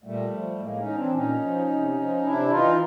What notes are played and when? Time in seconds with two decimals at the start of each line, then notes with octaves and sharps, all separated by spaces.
0.04 A#2 G3 A3
0.31 F3
0.59 A2 G#3 A#3
0.77 C#4 D#4
0.86 E3
0.95 C4 D4
1.13 A#2 C#4 D#4
1.41 F3
1.69 C3
1.96 F3
2.23 C3 D4 E4
2.50 E3 D#4 F4